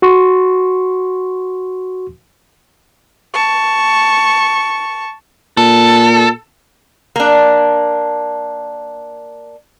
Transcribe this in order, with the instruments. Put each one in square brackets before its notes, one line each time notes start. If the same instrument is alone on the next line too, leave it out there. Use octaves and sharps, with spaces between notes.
[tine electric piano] F#4 C6 C#6
[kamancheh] A5 C#6
[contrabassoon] A#2 [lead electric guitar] A4
[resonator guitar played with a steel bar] A#3 D4